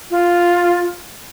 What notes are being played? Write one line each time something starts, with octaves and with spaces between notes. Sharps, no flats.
F4